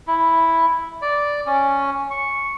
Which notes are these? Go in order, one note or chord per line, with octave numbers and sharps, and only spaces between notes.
E4
D5
C#4
C#6